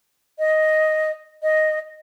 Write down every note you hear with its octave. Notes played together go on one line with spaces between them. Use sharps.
D#5
D#5